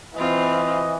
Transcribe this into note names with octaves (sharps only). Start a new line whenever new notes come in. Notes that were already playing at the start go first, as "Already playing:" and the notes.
E3 C4 F4 D#5